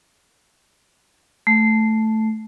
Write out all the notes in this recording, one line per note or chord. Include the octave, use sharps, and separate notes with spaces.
A3